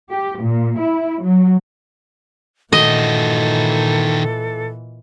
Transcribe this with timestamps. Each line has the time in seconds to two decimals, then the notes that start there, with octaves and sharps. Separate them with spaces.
0.11 G4
0.41 A#2
0.80 E4
1.23 F#3
2.73 A#2 D#3 E3 F#4 A4 D#5